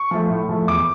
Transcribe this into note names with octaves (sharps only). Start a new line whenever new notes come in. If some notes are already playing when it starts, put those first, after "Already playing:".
Already playing: C#6
F3 A3
A2
F3 A3
E2 D6